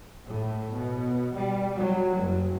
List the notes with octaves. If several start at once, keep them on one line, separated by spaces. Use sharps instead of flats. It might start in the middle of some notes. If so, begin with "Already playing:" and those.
A2
B2
G3
F#3
F#1